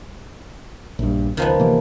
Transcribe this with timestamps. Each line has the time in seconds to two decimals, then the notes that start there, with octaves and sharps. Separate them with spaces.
0.99 A#1 G2
1.37 C#2 D#3 F3 B3
1.60 C3 E3 A#3